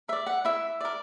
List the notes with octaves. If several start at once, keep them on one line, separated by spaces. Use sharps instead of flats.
A#4 D5 E5
F#5
E4 E5
A#4 D5